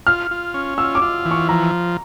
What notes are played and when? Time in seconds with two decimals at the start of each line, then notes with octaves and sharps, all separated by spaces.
0.07 F4 F6
0.31 F4
0.54 C#4
0.78 F4 E6
0.95 D6
1.02 F4
1.25 E3
1.31 C#6
1.49 F3 A#5